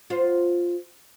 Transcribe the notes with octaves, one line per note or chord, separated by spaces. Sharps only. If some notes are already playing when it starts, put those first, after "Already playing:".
F4 C5